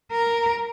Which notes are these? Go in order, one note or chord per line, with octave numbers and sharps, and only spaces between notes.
A#4